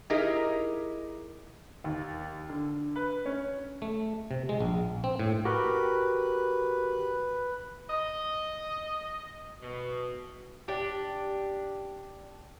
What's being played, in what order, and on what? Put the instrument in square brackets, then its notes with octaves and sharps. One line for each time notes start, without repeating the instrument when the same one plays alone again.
[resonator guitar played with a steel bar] D#4 E4 G4 G#4 A#4 D#5
[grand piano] D#2
D3
B4
C#4
[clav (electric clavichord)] A3
C3
G#3
A#1
C4
A2
[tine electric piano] F#4 G4 A#4 [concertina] B4
[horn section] D#5
B2
[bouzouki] D4 G4